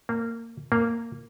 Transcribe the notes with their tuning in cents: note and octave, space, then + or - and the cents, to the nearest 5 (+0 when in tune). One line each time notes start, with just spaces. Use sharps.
A#3 -20
A#3 -10